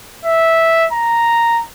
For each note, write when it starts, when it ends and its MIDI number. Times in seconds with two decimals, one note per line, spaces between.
0.25 0.85 76
0.93 1.62 82